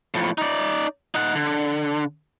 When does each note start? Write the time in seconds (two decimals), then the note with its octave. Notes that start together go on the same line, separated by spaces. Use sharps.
0.14 A2 F3
0.38 D#4 D5
1.15 D#4 F#5
1.35 D3